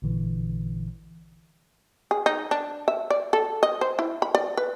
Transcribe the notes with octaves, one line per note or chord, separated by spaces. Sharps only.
A1 A#2 D3 E3
G#4
D#4
D4
E5
D5
A4
D#5
C5
E4
B5
D5
B4